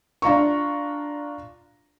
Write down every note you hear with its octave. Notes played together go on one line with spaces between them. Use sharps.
D4 F4 A#5 C#6